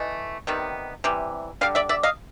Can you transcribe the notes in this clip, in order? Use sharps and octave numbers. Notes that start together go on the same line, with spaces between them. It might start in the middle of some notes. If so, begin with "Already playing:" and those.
Already playing: E3 A3 D#5
C3 D#3 G3 B3
C3 E3 G3
D3 G3 F5
D5 E5
D5 E5
D#5 F5